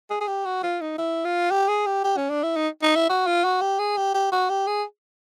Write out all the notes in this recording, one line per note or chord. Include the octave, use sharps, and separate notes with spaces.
G#4
G#4
G4
F#4
F4
D#4
E4
F4
G4
G#4
G4
G4
C#4
D4
E4
D#4
D#4
E4
F#4
F4
F#4
G4
G#4
G4
G4
F#4
G4
G#4